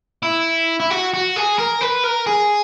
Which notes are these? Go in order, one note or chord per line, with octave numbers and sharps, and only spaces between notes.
E4
E4
F#4
F#4
G#4
A#4
B4
A#4
G#4